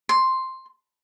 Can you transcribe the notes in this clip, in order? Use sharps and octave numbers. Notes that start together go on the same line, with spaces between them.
C6